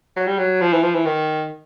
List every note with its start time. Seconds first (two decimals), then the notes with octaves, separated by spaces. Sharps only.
0.16 F#3
0.27 G3
0.39 F#3
0.61 F3
0.73 E3
0.83 F3
0.95 E3
1.06 D#3